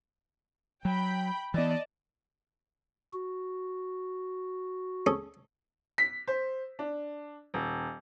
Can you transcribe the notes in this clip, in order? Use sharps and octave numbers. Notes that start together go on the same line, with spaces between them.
F#3 G5 B5
E3 B3 D5 D#5 A5
F#4
C#4 G#4 A4
B6
C5
D4
D#1